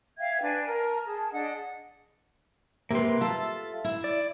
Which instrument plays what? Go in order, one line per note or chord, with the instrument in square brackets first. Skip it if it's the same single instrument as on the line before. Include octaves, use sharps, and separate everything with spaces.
[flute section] E5 F5 G5 G#6
D4 B4 G#5
A#4 A5
G#4 A5
D4 G#4 D#5 F#5
[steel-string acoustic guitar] C3 B4 [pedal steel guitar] A#3 C6
[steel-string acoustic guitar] F4 A4 [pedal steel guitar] E5
[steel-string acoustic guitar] E4
[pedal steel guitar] D5